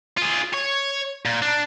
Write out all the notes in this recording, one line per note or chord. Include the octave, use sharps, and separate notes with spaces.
F4 G#4
C#5
A#2
D4